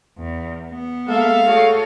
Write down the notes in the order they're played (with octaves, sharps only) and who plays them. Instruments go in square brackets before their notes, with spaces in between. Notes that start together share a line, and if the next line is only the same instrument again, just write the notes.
[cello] E2
B3
[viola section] G#3 A#3 [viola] A4 E5 [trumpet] F5
[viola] A3 G#4 [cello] F#4 C#5 [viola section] A4